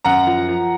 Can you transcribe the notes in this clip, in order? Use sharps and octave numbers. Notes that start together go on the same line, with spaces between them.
F#2 F#5 A#5
F3
F3